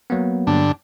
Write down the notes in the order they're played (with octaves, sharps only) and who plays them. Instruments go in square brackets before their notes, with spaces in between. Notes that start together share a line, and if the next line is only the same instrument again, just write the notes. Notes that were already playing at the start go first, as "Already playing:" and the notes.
[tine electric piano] F#3 A#3 B3
[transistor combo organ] G2 D3 D4